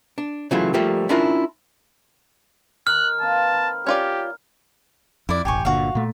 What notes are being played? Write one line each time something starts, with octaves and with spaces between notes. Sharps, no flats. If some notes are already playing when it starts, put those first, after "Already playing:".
D4
C#3 E3 F#3 A3 E4 F4
F3 G3 A3 A#3 F4 G4
C#4 D4 E4 F4 A#4
D#3 F6 F#6
A#3 C4 B4 A5
B5
C#4 F4 G4 D5
F2 E4 D5
E1 A1 G4 G#5 C#6
G1 A#2 D3 F#4 F5
A#2 A3